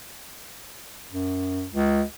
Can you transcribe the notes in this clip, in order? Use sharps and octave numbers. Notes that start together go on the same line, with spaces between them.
F#2
C#2